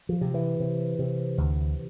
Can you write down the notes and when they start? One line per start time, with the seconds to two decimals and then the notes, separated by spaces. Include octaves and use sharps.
0.09 F3
0.21 C3
0.34 E3
0.60 C3
0.99 C3
1.38 D2